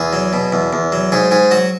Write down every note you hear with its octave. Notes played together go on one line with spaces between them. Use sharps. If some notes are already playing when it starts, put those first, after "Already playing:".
Already playing: E2 G#4
F#3
B2
E2
E2
F#3
G#2 G#4
G#2 G#4
F#3 F#4